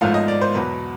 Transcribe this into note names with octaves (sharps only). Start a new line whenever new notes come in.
G#1 G#2 F3 A3 F5
D#5
D5
C5
E2 B2 F#3 B4